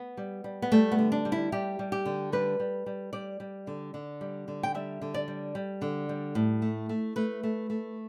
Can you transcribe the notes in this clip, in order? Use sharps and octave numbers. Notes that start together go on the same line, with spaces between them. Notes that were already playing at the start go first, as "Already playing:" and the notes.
Already playing: B3
G3
G3
B3
G3 A3
B3
D3
D4
G3
E4
G3 G4
G3
G4
D3
G3 B4
G3
G3
G3 D5
G3
D3
D3
G3
D3
G5
G3 E5
D3
D5
G3
G3
D3
G3
A2
A3
A3
A3 B4
A3
A3